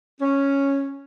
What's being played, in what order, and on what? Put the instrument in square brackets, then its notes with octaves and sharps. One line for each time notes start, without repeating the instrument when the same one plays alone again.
[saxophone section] C#4